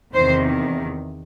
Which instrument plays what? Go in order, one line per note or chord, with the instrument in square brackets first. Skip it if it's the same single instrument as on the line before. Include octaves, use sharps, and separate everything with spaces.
[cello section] E2 C3 D#3 C5